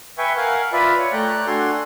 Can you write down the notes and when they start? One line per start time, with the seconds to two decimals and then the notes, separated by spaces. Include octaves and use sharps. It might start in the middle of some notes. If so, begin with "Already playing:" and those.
0.18 B4 E5 G5 G#5 C#6
0.37 A#4 F5 F#5 G#5
0.73 F4 B4 D5 E5 B5
0.98 C#5
1.13 A3 D5 G5 A#5 F#6
1.47 D4 F#4 A4 G#5 C6